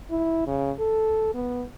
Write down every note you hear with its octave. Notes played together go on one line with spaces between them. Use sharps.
E4
C#3
A4
B3